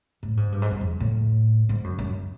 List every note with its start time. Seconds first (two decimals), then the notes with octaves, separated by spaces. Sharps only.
0.23 A2
0.37 G#2
0.52 G2
0.62 G#2
0.71 G2
0.81 F2
1.00 A2
1.69 G#2
1.84 F#2
1.99 F#2